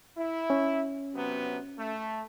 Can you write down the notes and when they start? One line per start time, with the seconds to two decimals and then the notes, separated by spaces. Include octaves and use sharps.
0.17 E4
0.50 C#4
1.14 C3 F#3 B3
1.78 A3